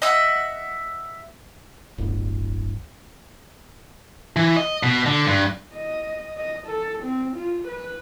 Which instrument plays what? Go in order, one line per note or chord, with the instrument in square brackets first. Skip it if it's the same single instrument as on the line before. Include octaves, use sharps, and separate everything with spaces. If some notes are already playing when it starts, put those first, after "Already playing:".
[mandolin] D#5 E5 F#5
[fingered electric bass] D1 G1
[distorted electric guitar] E3
D#5
B2
D3
G2
[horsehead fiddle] D#5
D#5
A4
C4
F4
B4